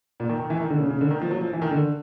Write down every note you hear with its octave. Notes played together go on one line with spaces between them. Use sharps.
A#2
D#3
D#3
E3
D#3
D3
C#3
C#3
D3
D#3
F3
F#3
F3
E3
D#3
D3